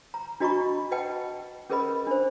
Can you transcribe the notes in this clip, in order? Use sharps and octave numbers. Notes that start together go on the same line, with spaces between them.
A#5
D4 F#4 D#5 A#5 B5 C#6
B4 D#5 F#5 G5 A5
C#4 G#4 A#4 B4 D#5 B5
D4 C5